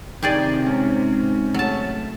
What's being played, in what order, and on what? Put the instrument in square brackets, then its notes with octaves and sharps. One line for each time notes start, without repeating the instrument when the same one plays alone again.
[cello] C3 [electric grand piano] D#3 [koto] G4 G#4 D5
[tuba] G#2 [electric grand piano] C#4
[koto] F#3 A5 [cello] A3